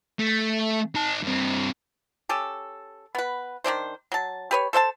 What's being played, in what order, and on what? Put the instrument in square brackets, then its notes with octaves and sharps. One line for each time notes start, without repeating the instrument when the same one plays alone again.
[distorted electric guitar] A3
D#4 A5
G2 C4
[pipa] C#4 G4 A4
B3 B4
D#3 G#3 D4 C5
F#3 A5
G4 B4 C#5
A4 C5 F5 A5